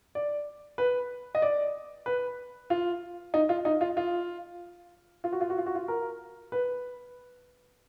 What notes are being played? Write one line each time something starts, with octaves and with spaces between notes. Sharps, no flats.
D5
B4
D#5
D5
B4
F4
D#4
F4
D#4
F4
F4
F4
F#4
F4
F#4
F4
F#4
F4
A#4
B4